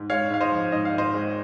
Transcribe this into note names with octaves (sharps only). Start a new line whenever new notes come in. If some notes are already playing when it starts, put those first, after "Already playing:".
Already playing: G#2
G#3 C#5 F5
G#2 F5
C5 D#5
F3
G#2 D#5
F5
G#1
C5 D#5
G#3